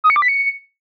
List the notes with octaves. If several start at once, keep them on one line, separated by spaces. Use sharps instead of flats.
D#6
C#7
D6
B6
C#7